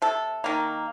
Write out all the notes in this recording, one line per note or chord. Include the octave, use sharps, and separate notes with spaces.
C3 A4
D#3 A#3